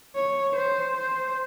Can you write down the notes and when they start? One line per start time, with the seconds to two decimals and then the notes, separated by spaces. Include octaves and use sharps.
0.15 C#5
0.55 C5
0.97 C5